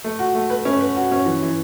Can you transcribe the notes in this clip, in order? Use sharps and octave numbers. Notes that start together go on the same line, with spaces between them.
A3
F#4
A3
B4
C#4
B4
F#4
C#4
E3
E3